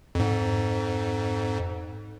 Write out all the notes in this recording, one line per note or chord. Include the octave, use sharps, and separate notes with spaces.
F2 G#2